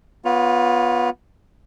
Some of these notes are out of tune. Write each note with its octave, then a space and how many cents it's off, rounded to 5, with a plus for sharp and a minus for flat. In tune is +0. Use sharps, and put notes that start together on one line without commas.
B3 -10 F4 +20 C#5 +5